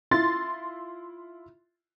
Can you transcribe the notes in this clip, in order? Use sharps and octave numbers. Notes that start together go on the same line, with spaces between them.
E4 F4 C6 A6